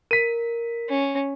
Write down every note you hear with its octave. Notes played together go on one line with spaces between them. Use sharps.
A#4 B6 D#7
C#4